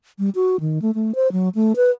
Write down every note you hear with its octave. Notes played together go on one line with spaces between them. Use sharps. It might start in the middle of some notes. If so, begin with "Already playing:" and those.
G3
F#4
D#3
A3
A3
C5
F#3
A3
B4